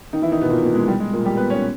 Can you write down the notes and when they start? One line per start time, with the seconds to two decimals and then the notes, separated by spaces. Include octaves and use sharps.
0.13 D#3 D#4
0.22 E3 E4
0.31 D#3 D#4
0.41 B2 B3
0.50 A#2 A#3
0.63 A#2 A#3
0.75 G#3
0.88 G3
1.00 G#3
1.13 A#2 A#3
1.25 G3 G4
1.37 B3 B4
1.50 C#4 C#5